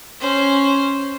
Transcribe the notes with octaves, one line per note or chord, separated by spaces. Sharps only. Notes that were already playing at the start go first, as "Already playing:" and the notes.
C#4 C5